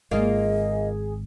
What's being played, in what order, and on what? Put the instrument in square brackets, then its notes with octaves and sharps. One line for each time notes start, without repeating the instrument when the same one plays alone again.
[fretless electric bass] G#1 G#2 G#3 [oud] A#3 F4 F5 [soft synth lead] G#4 [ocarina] D#5